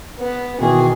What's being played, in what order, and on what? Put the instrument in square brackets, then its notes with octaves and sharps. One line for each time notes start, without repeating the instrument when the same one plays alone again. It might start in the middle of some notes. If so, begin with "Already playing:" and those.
[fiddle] B3
[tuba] B2 [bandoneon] D#3 E3 [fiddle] G#4